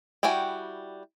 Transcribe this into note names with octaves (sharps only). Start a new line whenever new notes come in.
G3 E4 F#4 G5 G#5